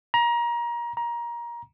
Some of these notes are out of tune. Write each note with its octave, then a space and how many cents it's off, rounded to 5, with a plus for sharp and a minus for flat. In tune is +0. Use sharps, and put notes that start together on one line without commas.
A#5 +25
A#5 +20